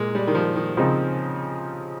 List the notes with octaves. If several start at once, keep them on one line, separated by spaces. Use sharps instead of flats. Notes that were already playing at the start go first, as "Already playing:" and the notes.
Already playing: A#2 G#3 A#3
G3
D#3
F3
D#3
C#3 F3 C4 D#4